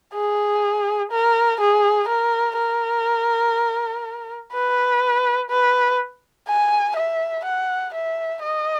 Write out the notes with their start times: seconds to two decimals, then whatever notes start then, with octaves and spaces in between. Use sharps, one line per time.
0.14 G#4
1.12 A#4
1.60 G#4
2.08 A#4
2.57 A#4
4.53 B4
5.50 B4
6.48 G#5
6.96 E5
7.45 F#5
7.94 E5
8.43 D#5